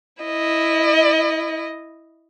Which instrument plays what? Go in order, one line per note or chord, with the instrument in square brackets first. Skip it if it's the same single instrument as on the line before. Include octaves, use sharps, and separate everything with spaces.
[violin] E4 D#5